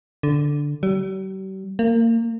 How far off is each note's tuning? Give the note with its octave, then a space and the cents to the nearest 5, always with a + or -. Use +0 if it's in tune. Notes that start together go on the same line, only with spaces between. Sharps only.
D3 -5
G3 -45
A#3 -25